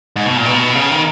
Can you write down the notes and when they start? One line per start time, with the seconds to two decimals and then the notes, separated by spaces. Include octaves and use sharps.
0.16 G#2
0.26 B2
0.36 A#2
0.45 B2
0.75 C#3
0.91 D#3